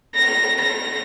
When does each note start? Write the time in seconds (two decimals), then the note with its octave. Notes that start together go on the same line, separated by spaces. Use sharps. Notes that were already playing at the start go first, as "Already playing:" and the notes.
0.16 A#6
0.61 A#6